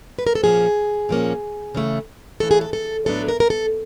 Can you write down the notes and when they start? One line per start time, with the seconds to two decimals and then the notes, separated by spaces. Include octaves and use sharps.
0.19 B4
0.27 A#4
0.35 A4
0.43 A#2 F3 A#3 C#4 G#4
1.09 A#2 F3 A#3 C#4
1.75 C#3 E3 A3
2.40 C#3 E3 A3 A4
2.51 G#4
2.61 A4
2.73 A4
3.06 A2 F#3 B3 D4 A4
3.28 A#4
3.40 A#4
3.50 A4